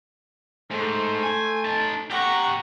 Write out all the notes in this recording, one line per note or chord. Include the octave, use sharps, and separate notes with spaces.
G#2 A3 C5
G#5
D#4 A5
G4 F#5 A#5 C#6